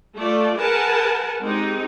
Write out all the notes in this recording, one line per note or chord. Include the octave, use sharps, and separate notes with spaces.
A3 F4 D5
G#4 A#4 B4 F#5 G#5 A5
G#3 C4 D#4 G4